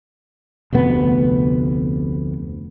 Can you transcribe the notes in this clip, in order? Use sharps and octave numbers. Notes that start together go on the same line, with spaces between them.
F1 D2 C3 B3